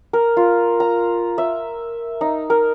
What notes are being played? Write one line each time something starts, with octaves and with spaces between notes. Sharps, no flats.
A#4
F4
A#5
E5
D#4
A#4